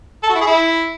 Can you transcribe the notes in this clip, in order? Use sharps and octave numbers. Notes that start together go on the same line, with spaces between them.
A4
F#4
E4
G#4
E4